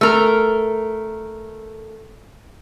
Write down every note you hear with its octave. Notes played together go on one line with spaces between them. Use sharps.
A3 A#4